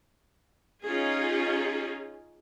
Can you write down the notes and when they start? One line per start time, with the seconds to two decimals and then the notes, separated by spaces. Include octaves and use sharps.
0.84 C#4 D#4 F4 G#4